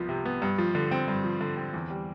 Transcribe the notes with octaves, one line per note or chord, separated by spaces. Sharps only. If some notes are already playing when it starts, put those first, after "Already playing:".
Already playing: C2 F3 B3
C3
B3
G2
F3
D3
C4
G2
F3
D3
C4
E2
G3